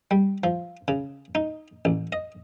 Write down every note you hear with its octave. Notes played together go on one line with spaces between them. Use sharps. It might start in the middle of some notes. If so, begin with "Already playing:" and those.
G3
F3
C#3
D#4
A1
D#5